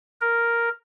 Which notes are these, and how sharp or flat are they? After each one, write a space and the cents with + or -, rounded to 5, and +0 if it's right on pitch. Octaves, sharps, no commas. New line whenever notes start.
A#4 +0